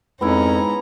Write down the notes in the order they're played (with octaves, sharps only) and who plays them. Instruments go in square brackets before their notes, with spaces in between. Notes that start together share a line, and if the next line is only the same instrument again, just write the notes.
[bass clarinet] F2 [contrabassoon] G#2 [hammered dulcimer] B3 E4 [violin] C#4 A#5